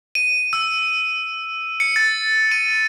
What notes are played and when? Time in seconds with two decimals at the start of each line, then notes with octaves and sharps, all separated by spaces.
0.15 D#7
0.53 E6
1.80 C#7
1.96 A6
2.51 D#7